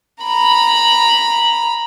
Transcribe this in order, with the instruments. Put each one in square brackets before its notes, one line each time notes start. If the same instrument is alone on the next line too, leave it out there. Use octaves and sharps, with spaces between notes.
[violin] A#5 B5